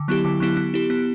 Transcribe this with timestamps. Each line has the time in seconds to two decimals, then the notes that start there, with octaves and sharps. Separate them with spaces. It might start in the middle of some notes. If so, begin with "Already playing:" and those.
Already playing: D3
0.08 F#3 B3 E4 G4
0.25 D3
0.40 F#3 B3 E4 G4
0.57 B3
0.74 E4 G4
0.90 B3